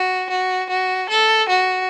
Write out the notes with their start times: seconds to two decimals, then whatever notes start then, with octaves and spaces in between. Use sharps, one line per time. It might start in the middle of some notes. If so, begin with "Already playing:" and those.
Already playing: F#4
0.30 F#4
0.69 F#4
1.09 A4
1.49 F#4